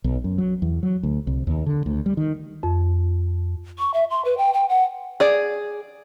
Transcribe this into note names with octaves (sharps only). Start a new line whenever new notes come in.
B1
F#2
F#3
E2
F#3
D2
C2
D#2
D3
D2
G3
D#3
F2
C#6
E5
C6
B4
G5
G5
F#5
G#4 D5